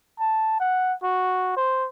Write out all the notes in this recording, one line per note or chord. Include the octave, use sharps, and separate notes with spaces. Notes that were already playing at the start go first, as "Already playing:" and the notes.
A5
F#5
F#4
C5